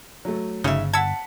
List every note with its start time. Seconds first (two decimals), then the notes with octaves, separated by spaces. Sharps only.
0.25 F#3 A3
0.64 G1 C#3 D#4 E5
0.93 F#5 A5 E6 G#6 B6 C#7